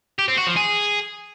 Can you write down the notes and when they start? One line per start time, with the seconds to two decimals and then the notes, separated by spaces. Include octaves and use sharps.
0.19 G4
0.28 C4
0.38 F#4
0.47 F3
0.56 G#4